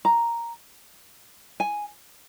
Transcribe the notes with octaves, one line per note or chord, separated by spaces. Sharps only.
A#5
G#5